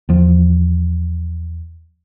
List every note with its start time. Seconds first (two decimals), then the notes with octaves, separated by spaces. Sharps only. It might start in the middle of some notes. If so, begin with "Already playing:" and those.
0.09 E2 F3